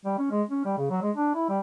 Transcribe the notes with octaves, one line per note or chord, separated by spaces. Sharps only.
G3
C#4
G#3
C#4
G3
C#3
F#3
G#3
D4
E4
G3